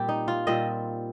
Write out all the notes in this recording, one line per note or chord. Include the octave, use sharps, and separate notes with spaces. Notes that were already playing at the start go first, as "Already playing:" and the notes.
Already playing: A#2 G3 C4 G4
D#4
F4
A#2 G3 C4 D#5